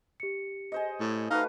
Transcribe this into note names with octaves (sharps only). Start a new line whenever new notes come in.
G4 C#7
G#4 C5 D#5
A2
A3 D#4 F#4 B4 F5